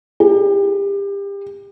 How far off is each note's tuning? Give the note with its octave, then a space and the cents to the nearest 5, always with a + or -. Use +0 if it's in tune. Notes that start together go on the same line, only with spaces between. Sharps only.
G4 +30